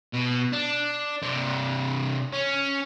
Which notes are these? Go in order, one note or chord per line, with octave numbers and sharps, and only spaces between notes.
B2
D4
C3 D4
C#4